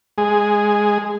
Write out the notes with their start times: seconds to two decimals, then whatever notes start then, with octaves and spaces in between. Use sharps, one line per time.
0.18 G#3 G#4